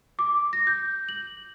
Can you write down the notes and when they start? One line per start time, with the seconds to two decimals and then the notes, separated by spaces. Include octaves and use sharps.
0.19 D6
0.53 A#6
0.67 G6
1.09 F#7